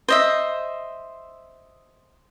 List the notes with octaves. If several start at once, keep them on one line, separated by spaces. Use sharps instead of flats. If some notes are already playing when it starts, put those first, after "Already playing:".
C5 D#5 E5